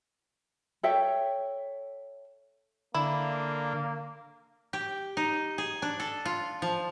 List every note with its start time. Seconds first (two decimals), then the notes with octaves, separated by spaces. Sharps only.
0.83 A4 C#5 E5 G5
2.95 D3 A#3 E4
4.73 G4
5.17 D#4
5.58 G#4
5.82 D4
6.00 A4
6.25 F4
6.62 F3